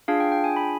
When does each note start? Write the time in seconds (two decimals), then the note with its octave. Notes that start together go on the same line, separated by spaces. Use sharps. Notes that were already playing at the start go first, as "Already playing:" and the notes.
0.08 D4 F4 G#4 F5
0.20 G5
0.32 G5
0.44 G#5
0.56 B5